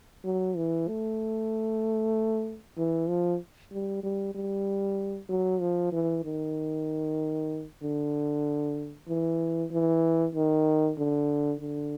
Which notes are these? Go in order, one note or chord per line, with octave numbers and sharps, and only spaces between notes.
F#3
E3
A3
E3
F3
G3
G3
G3
F#3
F3
E3
D#3
D3
E3
E3
D#3
D3
D3